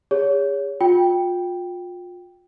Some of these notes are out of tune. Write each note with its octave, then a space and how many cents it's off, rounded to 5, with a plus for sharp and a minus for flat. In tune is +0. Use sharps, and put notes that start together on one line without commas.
G#4 -35 C#5 +25
F4 +30 G5 +0